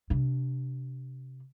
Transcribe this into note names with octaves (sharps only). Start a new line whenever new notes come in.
C3 D4